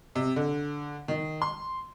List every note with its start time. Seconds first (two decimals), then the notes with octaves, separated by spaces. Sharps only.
0.15 C3
0.36 D3
1.08 D#3
1.42 C6